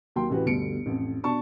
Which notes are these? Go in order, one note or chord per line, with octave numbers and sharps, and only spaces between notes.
D#2 F#3 G5 C6
A1 E3 F#4 G4 B4
G1 D2 B2 G3 C#7 D7
A1 F2
B2 D4 A5 C#6